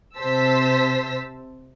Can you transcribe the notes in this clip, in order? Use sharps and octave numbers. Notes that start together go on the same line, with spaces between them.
C3 C5 A5 E6 B6